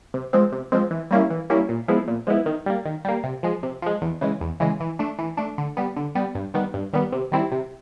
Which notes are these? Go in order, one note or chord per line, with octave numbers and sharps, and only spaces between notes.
C3
F3 G#3 C4
C3
F3 G#3 C4
E3
G3 A#3 C#4 E4
E3
G3 A#3 C#4 E4
A#2
F3 G#3 B3 E4
A#2
F3 G#3 B3 E4
D#3
G3 A#3
D#3
G3 A#3
C3
F3 G#3
C3
F3 G#3
E2
C#3 E3 G#3
E2
C#3 E3 G#3
E3
A3 D4
E3
A3 D4
D3
G3 B3
D3
G3 B3
G2
D#3 G3 B3
G2
D#3 G3 B3
C3
D#3 G3 C4 E4
C3